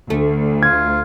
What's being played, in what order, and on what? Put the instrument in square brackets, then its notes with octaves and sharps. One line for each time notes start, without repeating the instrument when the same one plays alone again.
[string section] D2 [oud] A3
[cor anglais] F4 [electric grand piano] G#6